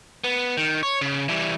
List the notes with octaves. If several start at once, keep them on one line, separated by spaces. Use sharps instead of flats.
B3
D#3
C#5
C#3
E3 G3